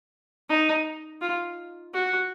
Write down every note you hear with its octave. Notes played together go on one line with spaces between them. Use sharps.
D#4
F4
F#4